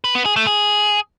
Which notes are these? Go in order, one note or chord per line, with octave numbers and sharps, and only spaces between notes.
B4
B3
G#4
A3
G#4